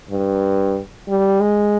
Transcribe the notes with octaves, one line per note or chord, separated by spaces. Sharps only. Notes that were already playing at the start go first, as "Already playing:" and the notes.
G2
G3
G#3